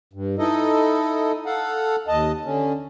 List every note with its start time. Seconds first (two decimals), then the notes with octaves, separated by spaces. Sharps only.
0.13 G2
0.39 D#4 E4 A4 D#5
1.46 A4 F5 F#5
2.08 D#2 D#5 A5
2.45 D3 C#4